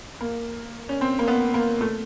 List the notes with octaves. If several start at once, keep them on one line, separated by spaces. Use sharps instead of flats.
A#3
C#4
C4
A#3
B3
A#3
A3